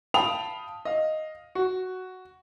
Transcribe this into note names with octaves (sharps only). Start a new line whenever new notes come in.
F5 G5 A5 B5 D#6 F7
D#5 F5
F#4